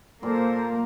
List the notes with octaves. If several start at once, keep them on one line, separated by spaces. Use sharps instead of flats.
A#2 A#3 A4 A#4 C5